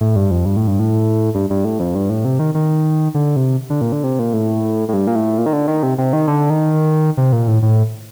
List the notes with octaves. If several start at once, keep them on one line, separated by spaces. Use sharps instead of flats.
A2
G2
F2
G2
A2
G2
A2
G2
G2
A2
F2
G2
A2
C3
D#3
D#3
D3
C3
D3
A#2
D3
C3
A#2
A2
A2
G2
A#2
A2
A#2
D#3
D3
D#3
C3
C3
D#3
D3
D#3
C3
A#2
A2
A2